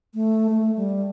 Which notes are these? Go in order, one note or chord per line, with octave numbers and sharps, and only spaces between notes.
A3
A3
G3